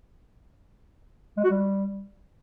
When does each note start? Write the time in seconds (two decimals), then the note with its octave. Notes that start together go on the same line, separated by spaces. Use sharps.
1.37 G#3
1.44 F#4
1.50 G3